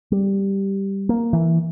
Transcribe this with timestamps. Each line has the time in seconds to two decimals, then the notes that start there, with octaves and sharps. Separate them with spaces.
0.12 G3
1.09 A#3
1.33 E3